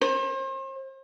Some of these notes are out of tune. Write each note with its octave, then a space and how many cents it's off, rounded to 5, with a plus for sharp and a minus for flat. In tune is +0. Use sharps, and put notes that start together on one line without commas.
C5 +40